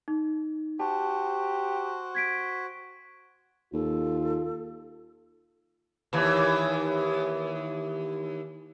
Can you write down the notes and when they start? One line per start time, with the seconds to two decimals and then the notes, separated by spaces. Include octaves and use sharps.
0.08 D#4
0.80 F#4 G4 C5 A5
2.15 G#6 B6 D7
3.73 D#2 F4 A4
6.13 D#2 E3